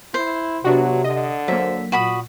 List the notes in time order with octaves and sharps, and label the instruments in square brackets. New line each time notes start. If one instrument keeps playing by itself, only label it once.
[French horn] E4 [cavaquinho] C5
[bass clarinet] C3 [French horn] F#3 [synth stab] B3 D4 F#4
[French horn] D3 [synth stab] D#5
[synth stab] F#3 A#3 [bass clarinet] C5 [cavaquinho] E5
[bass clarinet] A#2 [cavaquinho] F#4 B5 D#6